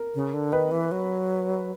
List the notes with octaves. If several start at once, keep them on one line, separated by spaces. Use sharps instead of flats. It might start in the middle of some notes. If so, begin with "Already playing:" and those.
Already playing: A#4
C#3
D3
D#3 B4
E3
F#3